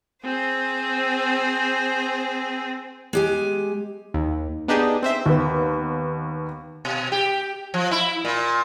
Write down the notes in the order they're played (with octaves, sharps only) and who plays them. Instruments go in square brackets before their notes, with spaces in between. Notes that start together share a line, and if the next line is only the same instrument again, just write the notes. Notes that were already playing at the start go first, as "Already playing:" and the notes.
[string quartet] C4 G#4 C5
[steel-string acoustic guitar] G#3 G4 G#5
[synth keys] D#2
B3 D4 D#4 G4 G#4
C4 C5 E5
[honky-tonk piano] D#2 B3
[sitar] B2
G4
F3
E4
A#2